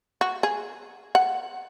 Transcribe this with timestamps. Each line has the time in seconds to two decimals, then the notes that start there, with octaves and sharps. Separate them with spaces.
0.21 F#4
0.43 G#4
1.15 F#5